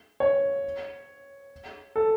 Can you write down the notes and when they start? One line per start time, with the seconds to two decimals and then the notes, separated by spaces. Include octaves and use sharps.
0.20 C#5
1.96 A4